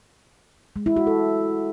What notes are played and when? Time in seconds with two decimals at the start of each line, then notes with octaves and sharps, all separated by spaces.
0.76 G#3
0.86 E4
0.96 F#4
1.07 A4